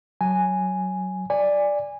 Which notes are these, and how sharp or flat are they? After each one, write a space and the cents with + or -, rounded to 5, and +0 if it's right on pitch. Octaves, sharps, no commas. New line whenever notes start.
F#3 +10 G#5 +0
D5 +0 G#5 -20